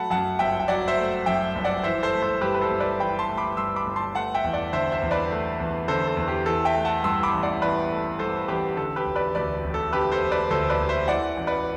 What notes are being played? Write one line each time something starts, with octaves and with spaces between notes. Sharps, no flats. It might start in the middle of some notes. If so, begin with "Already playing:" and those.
Already playing: F#3 A3 F#5 A5 B5
F#2 F#5 A5
G1 E5 G5
G5
F#3 D5 F#5
C5 E5
A3
F#2 E5 G5
G1
D5 F#5
E3 C5 E5
A4 C5
A3
A4 C5
G2 G4 B4
B4
A4 C5
G1
B4 D5
E3 G5 B5
A5 C6
A3
B5 D6
G2 C6 E6
B5 D6
G1
A5 C6
A3 F#5 A5
E5 G5
E2
D5 F#5
D3 C5 E5
C5 E5
E2
B4 D5
A3
E2
D3 A4 C5
A4
E2
G4
E3 A4
E5 G5
A3
F#5 A5
G2 C6 E6
B5 D6
A1
D5 F#5
E3 B4 D5
A3
G2 A4 C5
A1 G4 B4
D3 A4
G4 B4
E1
B4 D5
D2 B4 D5
E1
A4
D3 G4 B4
A4 C5
E1
B4 D5
D2 A4 C5
B4 D5
E1
C5 E5
E3 D5 F#5
A1
B4 D5